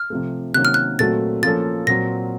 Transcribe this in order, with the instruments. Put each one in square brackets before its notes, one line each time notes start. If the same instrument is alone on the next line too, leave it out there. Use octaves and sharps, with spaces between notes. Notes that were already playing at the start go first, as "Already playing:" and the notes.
Already playing: [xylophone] F6
[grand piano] C3 F3 A3
[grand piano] C3 D#3 F#3 A#3 C#4 [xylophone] F#6
[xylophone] F6
F#6
[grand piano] A#2 F#3 A3 C4 F#4 [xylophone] A6
[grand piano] F3 A#3 C#4 A4 [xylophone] A6
[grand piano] A#2 F#3 C4 [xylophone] A#6